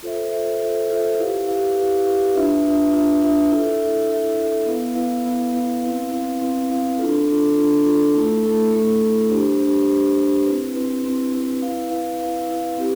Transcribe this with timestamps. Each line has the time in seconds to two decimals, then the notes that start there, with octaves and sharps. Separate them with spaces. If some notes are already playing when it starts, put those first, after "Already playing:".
0.03 F4 A4 C5 E5
0.31 F4 A4 C5 E5
0.61 F4 A4 C5 E5
0.89 F4 A4 C5 E5
1.18 E4 G4 B4 F5
1.47 E4 G4 B4 F5
1.77 E4 G4 B4 F5
2.05 E4 G4 B4 F5
2.35 D4 F4 B4 E5
2.63 D4 F4 B4 E5
2.93 D4 F4 B4 E5
3.22 D4 F4 B4 E5
3.50 E4 A4 E5
3.79 E4 A4 E5
4.09 E4 A4 E5
4.37 E4 A4 E5
4.66 B3 E4 B4 F5
4.95 B3 E4 B4 F5
5.24 B3 E4 B4 F5
5.53 B3 E4 B4 F5
5.82 C4 E4 B4 F5
6.11 C4 E4 B4 F5
6.40 C4 E4 B4 F5
6.69 C4 E4 B4 F5
6.98 D4 F4 A4
7.27 D4 F4 A4
7.56 D4 F4 A4
7.85 D4 F4 A4
8.14 A3 E4 A4
8.44 A3 E4 A4
8.73 A3 E4 A4
9.01 A3 E4 A4
9.30 D4 G4 C5
9.59 D4 G4 C5
9.88 D4 G4 C5
10.17 D4 G4 C5
10.46 C4 E4 B4
10.75 C4 E4 B4
11.04 C4 E4 B4
11.33 C4 E4 B4
11.62 E4 B4 F5
11.90 E4 B4 F5
12.20 E4 B4 F5
12.49 E4 B4 F5
12.78 C4 G4